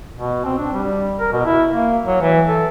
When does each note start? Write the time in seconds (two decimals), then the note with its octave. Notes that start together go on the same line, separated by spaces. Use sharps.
0.15 B2
0.45 C4
0.58 D4
0.73 G3
1.19 A#4
1.32 B2
1.45 E4
1.69 A#3
2.05 F#3
2.21 E3
2.47 A4